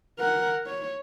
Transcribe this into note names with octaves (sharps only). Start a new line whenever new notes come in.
A#4 F#5
C#5